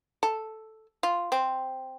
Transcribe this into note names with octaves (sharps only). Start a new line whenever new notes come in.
A4
F4
C4